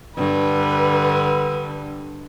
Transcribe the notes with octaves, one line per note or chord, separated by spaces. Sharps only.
G2 D3 B4